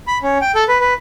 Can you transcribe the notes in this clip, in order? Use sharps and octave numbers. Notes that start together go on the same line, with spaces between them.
B5
C#4
G5
A4
B4
B4